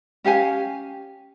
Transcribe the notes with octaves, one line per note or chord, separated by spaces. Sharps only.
C#4 G4 F5 G#5